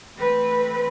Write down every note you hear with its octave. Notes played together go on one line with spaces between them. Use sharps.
E3 A3 C4 B4